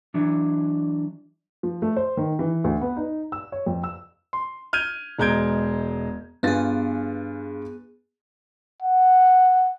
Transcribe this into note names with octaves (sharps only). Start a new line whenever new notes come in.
E3 F#3 D4
F3
A3
C5
D#3
E3
D2
B3
D#4
E6
C#5
F2
E6
C6
F6 G6 G#6 D#7
E1 G#3 A#5 G6 G#6 D7
G2 B3 F4 G#4 A6
F#5